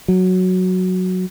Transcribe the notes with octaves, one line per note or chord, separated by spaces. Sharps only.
F#3